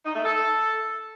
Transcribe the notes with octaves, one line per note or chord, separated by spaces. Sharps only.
D#4
A3
A4